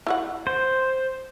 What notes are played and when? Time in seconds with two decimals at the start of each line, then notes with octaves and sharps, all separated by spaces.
0.07 E4 F#4 F#5
0.47 C5